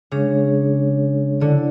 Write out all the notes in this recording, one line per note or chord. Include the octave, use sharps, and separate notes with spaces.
C#3 G#3 D4 G#4 C#5
D3 E4 A4 D5